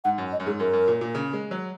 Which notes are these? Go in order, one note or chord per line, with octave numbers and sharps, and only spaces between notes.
G#2 F#5
F#2
D#5
F#2
G#2 G#4
F#2 A#4
F#2
A#2
A#2
C#3
G#3
F#3